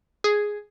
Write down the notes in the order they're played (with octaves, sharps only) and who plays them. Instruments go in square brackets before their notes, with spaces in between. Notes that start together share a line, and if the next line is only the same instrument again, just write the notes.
[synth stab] G#4